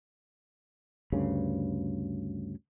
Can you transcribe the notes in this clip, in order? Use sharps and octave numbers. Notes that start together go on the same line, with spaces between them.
D2 G2 C#3